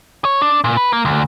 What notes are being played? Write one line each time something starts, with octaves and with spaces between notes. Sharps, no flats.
C#5
D4
A#2
B4
A#3
D2